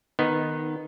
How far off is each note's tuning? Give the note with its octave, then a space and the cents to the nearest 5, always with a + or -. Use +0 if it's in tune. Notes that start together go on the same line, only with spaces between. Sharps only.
D#3 -10 B3 +0 D#4 +0